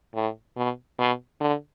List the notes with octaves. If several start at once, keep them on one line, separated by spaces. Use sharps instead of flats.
A2
B2
B2
D3